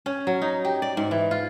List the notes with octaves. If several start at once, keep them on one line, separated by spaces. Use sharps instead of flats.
C#4
F#3
D#4
G4
D5
G#2
E3
F4